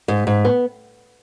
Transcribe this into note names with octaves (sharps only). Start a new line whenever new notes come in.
G#2
G#2
B3